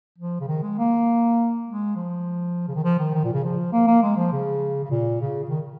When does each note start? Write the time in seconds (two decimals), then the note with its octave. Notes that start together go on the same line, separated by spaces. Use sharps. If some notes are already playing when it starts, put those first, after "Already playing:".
0.18 F3
0.40 C#3
0.48 D#3
0.63 G#3
0.78 A#3
1.67 G#3
1.96 F3
2.68 C#3
2.75 D#3
2.84 F3
2.99 D#3
3.14 D#3
3.24 A#2
3.33 C#3
3.44 F3
3.72 A#3
3.87 A#3
4.03 G#3
4.16 F3
4.32 C#3
4.84 C#3
4.90 A#2
5.21 C#3
5.43 C#3
5.49 D#3